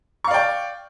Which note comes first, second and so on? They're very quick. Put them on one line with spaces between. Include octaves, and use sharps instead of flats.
C#6 F5 D5 G5